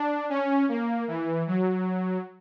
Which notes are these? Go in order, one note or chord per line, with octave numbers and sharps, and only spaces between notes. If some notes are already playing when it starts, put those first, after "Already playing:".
Already playing: D4
C#4
A#3
E3
F#3